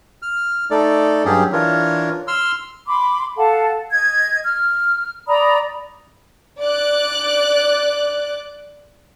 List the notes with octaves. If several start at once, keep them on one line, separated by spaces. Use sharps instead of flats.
F6
A3 D#4 A4 D5
G2 F#3 C#4 G4 G#4
E3 D4 F4 A#4 C#5
C6 E6 F6
B5 C6 D6
A4 F5 F#5 A5
D#5 G#6
F6
D5 A#5 B5 D#6
D5 D6 F#6